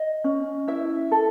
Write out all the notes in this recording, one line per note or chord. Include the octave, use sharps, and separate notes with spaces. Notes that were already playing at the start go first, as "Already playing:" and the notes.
Already playing: D#5
C#4
E4 E5
A4